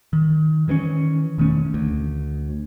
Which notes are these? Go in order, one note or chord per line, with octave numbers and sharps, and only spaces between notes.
D#3
D#3 E3 A#3 C#4
E1 D#3 A3 C#4
D2